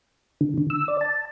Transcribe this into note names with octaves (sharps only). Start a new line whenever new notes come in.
D3
D3
E6
D5
A5